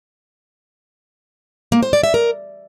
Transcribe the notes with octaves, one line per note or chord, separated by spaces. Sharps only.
A#3
C5
D5
E5
A#4